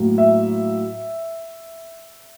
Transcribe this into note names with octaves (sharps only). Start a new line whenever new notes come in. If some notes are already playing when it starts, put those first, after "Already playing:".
Already playing: A2 F#3 A#3
E5